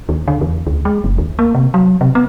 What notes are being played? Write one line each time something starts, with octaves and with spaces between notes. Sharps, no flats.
D#2
D3
E2
D2
G#3
F#1
D#2
A#3
C3
F#3
C3
B3